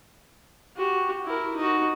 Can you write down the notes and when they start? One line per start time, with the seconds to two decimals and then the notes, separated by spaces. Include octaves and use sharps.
0.77 F#4 G4
1.24 E4 A#4
1.56 D#4 F#4